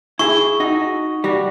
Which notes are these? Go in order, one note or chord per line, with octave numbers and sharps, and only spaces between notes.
E4 G#4 C#6
D#4 F#4
G3 F#4